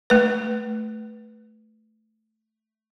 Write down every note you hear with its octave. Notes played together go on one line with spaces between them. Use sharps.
A3 B4